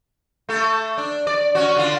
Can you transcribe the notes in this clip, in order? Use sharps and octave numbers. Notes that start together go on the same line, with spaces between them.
A3 A4
D4
D5
C#4 F#4
D3 F4